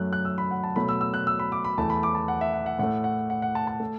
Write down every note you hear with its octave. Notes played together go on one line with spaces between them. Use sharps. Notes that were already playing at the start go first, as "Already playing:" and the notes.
Already playing: F#2 F#3 A3 F#6
F#6
E6
B5
F#5
A5
B2 F#3 A3 B5
E6
E6
F#6
E6
B5
D6
B5
E2 E3 A3 A5
B5
D6
A5
F#5
E5
F#5
F#5
A2 A3 F#5
F#5
F#5
F#5
A5
A5
A3